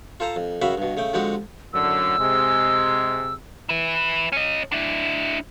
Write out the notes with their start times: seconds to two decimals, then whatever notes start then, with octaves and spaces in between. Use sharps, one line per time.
0.20 F4 A4 C5 F5 A#5
0.36 F2
0.62 F#2 C#3 F#4 E5 F5 B5
0.77 G2 B2
0.97 C#3 A3 G5
1.13 D3 F3 G#3 C4 F#4 G4
1.73 F#2 A2 D3 E6
2.19 C3 G#3
3.69 E4 B4
4.32 C#4 D#5
4.72 D4 E4